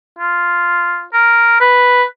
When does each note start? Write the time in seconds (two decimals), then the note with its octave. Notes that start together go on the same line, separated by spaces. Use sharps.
0.19 F4
1.13 A#4
1.61 B4